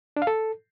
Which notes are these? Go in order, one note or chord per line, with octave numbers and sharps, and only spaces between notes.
D4
F5
A4